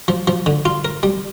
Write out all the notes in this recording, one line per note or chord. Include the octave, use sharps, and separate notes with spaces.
F3
F3
D3
F4
A#4
G3